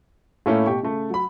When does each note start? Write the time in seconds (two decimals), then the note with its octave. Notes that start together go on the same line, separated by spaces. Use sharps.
0.46 A2 A3 A#3 C#4 E4
0.66 B2 G4 C#6
0.83 C#3 A3
1.10 F#3 B5